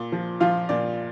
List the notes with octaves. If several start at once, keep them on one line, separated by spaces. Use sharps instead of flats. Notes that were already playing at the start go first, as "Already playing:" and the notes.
Already playing: A#2
F3
F3 F4 F5
A#2 D5